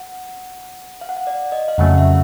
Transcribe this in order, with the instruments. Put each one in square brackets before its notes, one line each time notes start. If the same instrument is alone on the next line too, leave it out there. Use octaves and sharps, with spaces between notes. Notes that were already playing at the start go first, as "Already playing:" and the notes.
Already playing: [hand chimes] F#5
F5
F#5
F5
D5
D#5
F5
[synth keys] F2 C#3 F#3 A3 C#4 [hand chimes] F#5
[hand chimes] E5